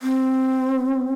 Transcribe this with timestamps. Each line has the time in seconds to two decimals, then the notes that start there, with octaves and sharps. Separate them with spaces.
0.03 C4